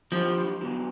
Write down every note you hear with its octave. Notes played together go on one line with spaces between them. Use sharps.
F3 A#3 D4 G4 C5
D3 F#3 B3